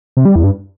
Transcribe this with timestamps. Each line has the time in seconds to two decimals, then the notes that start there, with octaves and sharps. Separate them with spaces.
0.17 C3
0.25 G3
0.36 E2
0.44 G2